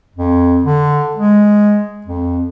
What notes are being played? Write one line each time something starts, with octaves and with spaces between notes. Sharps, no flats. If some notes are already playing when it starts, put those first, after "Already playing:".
F2
D3
G#3
F2